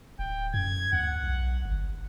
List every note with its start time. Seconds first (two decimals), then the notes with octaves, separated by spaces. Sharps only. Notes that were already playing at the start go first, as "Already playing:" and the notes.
0.19 D1 G5
0.54 F#2 G#6
0.93 D2 F#5
1.23 B1
1.65 G1